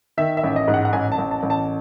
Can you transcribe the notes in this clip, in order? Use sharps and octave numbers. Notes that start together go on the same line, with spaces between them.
D#3 E5
E5
A1
D#5
G#2
F#5
F#5
A1 G#5
A5
A1
A5
A1
A5